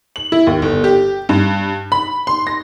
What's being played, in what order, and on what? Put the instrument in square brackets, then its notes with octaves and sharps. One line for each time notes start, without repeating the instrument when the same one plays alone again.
[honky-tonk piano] F#7
E4
D#2
G1
G4
G2
B5
C6
A#6